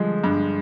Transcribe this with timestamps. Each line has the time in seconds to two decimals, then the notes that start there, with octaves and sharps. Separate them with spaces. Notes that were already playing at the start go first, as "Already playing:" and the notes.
Already playing: D3 F3 G3 G#3
0.24 G2